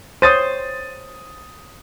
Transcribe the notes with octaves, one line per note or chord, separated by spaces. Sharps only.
C5 C#5 D#6 A6 D#7